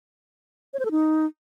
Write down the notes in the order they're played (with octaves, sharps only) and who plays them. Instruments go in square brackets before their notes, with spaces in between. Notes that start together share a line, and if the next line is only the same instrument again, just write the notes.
[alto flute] C#5
C5
A4
D#4